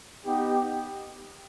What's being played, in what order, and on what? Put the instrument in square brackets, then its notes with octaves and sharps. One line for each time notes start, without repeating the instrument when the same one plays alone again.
[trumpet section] B3 D#4 G4